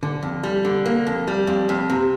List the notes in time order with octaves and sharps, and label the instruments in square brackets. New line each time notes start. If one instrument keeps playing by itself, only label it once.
[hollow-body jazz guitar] D3
F2
G3
D3
A#3
F2
G3
F2
F2
C3